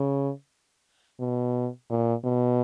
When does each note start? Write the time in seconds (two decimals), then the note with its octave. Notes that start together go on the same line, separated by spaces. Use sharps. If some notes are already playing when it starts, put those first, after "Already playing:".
Already playing: C#3
1.20 B2
1.90 A#2
2.24 B2